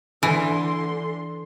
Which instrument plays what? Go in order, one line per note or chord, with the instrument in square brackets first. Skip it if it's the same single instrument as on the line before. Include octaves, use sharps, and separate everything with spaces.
[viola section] D3 C6 [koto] E3